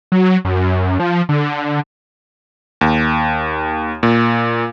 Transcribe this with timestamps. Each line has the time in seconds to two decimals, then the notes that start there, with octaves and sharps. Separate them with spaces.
0.12 F#3
0.45 F#2
1.00 F3
1.29 D3
2.81 D#2
4.03 A#2